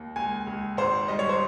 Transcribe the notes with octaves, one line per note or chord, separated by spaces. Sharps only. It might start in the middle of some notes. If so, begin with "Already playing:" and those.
Already playing: D#2
C#2 G#5
C#2
G#1 C5
G3 D#5
C#5
C5